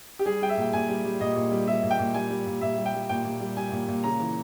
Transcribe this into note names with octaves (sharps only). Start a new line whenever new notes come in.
G4
G3 G#4
G3 G5
E5
A#2 G5
A#2 G#5
G3
G3
A#2 D#5
A#2
G3
G3 E5
A#2
G5
A#2
G3 G#5
G3
A#2
A#2 E5
G3
G5
G3
A#2 G5
A#2
G3
G3 G#5
A#2
A#2
C#3 A#5
E3